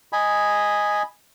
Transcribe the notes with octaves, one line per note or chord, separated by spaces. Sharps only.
D#5 G#5 B5